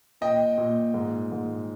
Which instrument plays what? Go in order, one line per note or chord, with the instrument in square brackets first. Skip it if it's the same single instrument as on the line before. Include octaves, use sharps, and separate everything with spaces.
[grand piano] A#2 D#5 G5
A#2
G#2
G#2